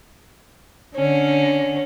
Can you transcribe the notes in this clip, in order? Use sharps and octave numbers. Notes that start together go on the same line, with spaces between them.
D3 C#4